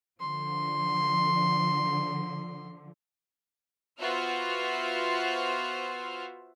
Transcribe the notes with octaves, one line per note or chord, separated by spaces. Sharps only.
D3 F3 C6
B3 F4 F#4 C5 E5 F6